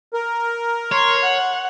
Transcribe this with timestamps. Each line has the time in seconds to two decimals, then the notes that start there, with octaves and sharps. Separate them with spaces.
0.14 A#4
0.92 C#5 C6
1.23 F#5